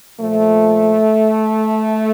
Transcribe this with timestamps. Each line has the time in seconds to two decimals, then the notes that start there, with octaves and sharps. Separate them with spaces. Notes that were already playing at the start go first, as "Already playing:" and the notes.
0.20 A#2 F3 A3